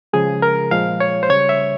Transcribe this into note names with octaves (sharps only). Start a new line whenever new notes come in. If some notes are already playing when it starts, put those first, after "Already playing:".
C#3 F3 G#3 G#4
A#4
A#2 F3 G#3 F5
C#5
C5
C#3 G3 C#5
E5